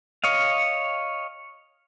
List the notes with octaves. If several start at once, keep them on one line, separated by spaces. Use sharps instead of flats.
C#5 D#5 F5